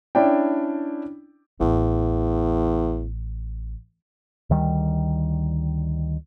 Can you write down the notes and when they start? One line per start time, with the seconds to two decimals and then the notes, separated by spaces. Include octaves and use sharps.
0.15 C#4 D4 E4 D5 G5
1.61 A1 E2
4.50 D2 D#3 G3